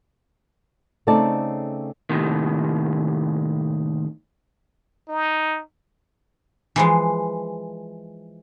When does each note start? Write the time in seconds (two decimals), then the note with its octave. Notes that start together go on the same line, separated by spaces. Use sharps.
1.07 C#3 A3 C4 D#4 D5 A5
2.09 D#2 A2 C3 D#3
5.09 D#4
6.76 E3 F3 G#3